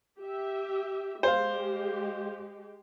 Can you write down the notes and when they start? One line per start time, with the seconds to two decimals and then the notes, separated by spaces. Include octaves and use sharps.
0.19 G4 E5
1.23 G#3 G4 C5 F5